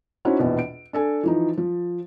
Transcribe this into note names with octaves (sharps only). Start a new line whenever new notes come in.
C#4 D#4 E4 F#4 C5
A#1 E2 B2
D7
D4 A4 G#5
E3 F3 D#4
F3